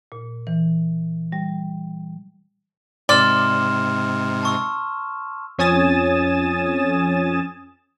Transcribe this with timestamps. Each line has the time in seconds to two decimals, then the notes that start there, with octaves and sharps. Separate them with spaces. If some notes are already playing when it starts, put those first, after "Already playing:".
0.12 A#2
0.47 E3
1.32 G3
3.09 G#2 C3 D5 C6 F6 E7
4.43 A5 C#6 E6
5.58 F2 C#4 G#5 D#6 A6 E7